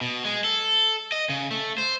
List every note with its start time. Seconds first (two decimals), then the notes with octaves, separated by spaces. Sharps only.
0.01 B2
0.25 G#3
0.44 A4
1.12 D#5
1.29 C#3
1.51 A3
1.78 C5